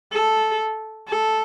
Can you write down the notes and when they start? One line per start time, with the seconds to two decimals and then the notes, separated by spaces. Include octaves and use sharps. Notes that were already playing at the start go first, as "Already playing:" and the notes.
0.13 A4
1.08 A4